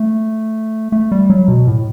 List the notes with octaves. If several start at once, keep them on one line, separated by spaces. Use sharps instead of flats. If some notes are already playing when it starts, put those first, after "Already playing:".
Already playing: A3
A3
G3
F#3
B2
A2